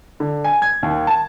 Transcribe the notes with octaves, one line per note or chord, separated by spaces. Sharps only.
D3
G#5
G#6
D#2
A5